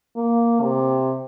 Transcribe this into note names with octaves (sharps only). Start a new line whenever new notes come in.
A#3
C3